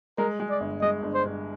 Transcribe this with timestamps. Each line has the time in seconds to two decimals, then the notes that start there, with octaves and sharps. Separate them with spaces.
0.18 G#3 A#4
0.40 G#3
0.50 D5
0.60 G1
0.81 G#3 D#5
1.02 G1
1.14 C5
1.24 G2